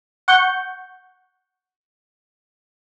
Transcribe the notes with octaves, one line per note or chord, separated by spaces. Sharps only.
F#5 C#6 G6